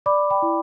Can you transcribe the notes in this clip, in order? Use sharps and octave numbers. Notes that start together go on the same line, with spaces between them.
D5 B5 D6
G5 B5
E4